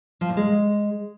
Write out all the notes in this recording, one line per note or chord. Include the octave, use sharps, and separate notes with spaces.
F3
A#2
G#3